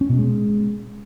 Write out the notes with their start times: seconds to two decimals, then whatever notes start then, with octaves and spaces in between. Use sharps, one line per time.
0.01 C#4
0.10 B2
0.18 G#3